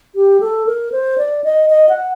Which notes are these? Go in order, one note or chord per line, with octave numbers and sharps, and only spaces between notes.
G4
A4
A#4
C5
D5
D#5
D#5
F#5